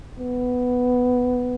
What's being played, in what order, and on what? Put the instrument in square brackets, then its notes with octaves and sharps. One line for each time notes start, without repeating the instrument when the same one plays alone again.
[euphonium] B3